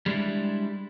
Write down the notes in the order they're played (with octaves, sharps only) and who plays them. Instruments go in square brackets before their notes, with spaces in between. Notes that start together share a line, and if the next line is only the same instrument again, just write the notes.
[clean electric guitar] G3 G#3 D4 E4